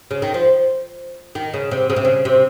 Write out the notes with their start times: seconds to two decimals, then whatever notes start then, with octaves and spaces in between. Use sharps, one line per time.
0.11 C#3
0.22 D#3
0.34 F3
1.35 D#3
1.54 C#3
1.71 C3
1.90 C#3
1.96 C3
2.05 C#3
2.25 C3